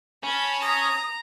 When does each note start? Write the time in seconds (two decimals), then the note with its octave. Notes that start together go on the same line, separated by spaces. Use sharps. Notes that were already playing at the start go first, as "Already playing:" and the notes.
0.24 C#4 A5 B5
0.62 A#5 D#6